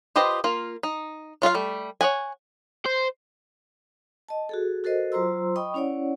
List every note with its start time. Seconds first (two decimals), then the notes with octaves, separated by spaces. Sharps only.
0.16 F4 G4 B4 C5 D#5
0.44 A#3 F4
0.83 D#4
1.42 F#3 F4 G#4 F5
1.55 G3 A3
2.01 C#5 D5 F#5 G#5
2.86 C5
4.29 D#5 A5
4.49 F#4 G#4 A4
4.84 F#4 A4 A#4 C5 D#5
5.12 F#3 F4 C5 A#5 C6 E6
5.56 D#5 G5 B5 C#6 D#6
5.74 C#4 E4 C#5 D5 F#5